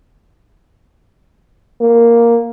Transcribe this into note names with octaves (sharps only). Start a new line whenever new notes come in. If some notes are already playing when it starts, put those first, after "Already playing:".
A#3